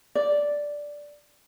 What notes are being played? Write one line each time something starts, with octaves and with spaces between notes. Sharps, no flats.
D5